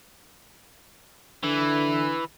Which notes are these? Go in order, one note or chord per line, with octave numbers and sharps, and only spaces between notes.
D3 E3